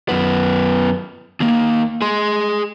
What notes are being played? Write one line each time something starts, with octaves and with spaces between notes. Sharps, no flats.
F#2 B3
D#2 A#3
G#4 C6